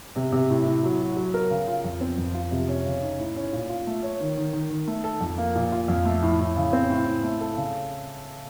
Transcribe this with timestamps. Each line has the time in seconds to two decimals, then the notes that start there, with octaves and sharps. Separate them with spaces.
0.16 C3
0.32 C3
0.50 A2
0.66 A2
0.83 F#3
1.00 F#4
1.16 F#3
1.34 A#4
1.50 C#3
1.67 F4
1.84 F2
2.01 C4
2.18 F2
2.34 F4
2.51 C3
2.68 C#4
2.85 C#3
3.02 D#4
3.19 A2
3.36 C#4
3.53 A#2
3.69 F4
3.87 A3
4.03 C#5
4.20 D#3
4.37 D#3
4.53 D#3
4.70 D#3
4.87 A3
5.04 A4
5.21 F2
5.38 A#3
5.55 A#2
5.72 F4
5.88 F2
6.05 A3
6.22 A2
6.39 A2
6.56 C#3
6.73 C4
6.90 A2
7.06 A2
7.23 A3
7.41 A4
7.57 C#3